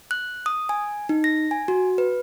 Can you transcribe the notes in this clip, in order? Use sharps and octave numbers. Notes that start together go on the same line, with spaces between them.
F#6
D#6
G#5
D#4
A#6
G#5
F#4
B4